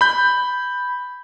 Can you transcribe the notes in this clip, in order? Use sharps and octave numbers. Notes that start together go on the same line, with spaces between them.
B5 G6